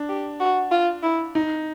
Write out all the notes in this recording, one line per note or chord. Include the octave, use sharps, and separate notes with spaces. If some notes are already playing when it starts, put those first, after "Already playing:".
Already playing: D4
G4
F#4
F4
E4
D#4